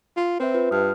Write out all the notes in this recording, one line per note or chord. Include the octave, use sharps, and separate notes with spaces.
F4
C4 B4 C5 E5
F4 B4
G2 D#6 F6